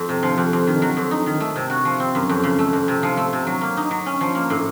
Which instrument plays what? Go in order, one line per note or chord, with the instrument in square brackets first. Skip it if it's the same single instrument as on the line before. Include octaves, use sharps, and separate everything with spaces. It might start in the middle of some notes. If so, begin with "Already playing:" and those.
Already playing: [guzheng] F2
C3
F3
F2
F2
D#3
F#3
F2
D#4
D#3
A3
C3
F#4
F3
C4
F#2
F2
C#3
A3
F2
C3
F3
A3
C3
F#3
A#3
D#4
F#3
C#4
F3
A#3
A2